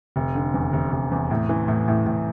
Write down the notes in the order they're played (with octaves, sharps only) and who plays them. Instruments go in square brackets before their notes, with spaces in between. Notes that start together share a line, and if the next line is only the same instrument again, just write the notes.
[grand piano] F1
D3
E2
F1
F1
E2
A2
E3
A2
A2
A2